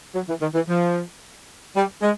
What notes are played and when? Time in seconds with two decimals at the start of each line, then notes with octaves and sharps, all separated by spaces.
0.15 F#3
0.29 E3
0.41 D#3
0.54 E3
0.69 F3
1.75 G3
2.02 G#3